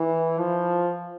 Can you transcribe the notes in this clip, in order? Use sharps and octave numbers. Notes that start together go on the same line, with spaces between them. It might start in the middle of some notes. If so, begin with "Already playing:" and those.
Already playing: E3
F3